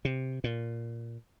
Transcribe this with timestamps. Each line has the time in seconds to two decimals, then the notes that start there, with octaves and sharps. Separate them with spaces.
0.05 C3
0.44 A#2